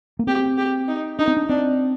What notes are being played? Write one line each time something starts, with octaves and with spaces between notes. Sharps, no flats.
A#3
C4 G4
G4
D#4
D4 D#4
C4
D4
C4 D4